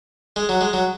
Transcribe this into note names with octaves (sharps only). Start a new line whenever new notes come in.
G#3
F#3
G#3
F#3